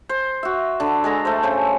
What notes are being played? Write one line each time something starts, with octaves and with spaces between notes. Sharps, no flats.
C5
F#4 E5
D3
G#3 A4 A#5
A3 C5
C#3 C5